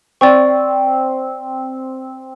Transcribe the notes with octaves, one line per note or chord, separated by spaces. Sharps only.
C4 D5 G5 C#6